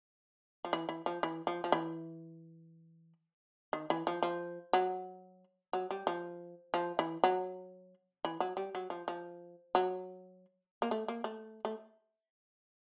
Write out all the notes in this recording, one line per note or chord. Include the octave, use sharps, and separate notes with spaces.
F3
E3
E3
F3
E3
F3
F3
E3
D#3
E3
F3
F3
F#3
F#3
G3
F3
F3
E3
F#3
E3
F#3
G3
F#3
F3
F3
F#3
A#3
A3
A#3
A3
A3